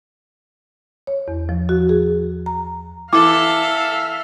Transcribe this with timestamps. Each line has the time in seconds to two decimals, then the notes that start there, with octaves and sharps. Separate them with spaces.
1.07 C#5
1.28 E2
1.49 F3
1.69 F#4
1.89 G#4
2.46 A#5
3.13 E3 A4 E5 F5 D6